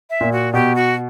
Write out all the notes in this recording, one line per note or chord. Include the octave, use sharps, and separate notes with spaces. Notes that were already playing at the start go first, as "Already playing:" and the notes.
E5
A#2
F#4
B2 G4
F#4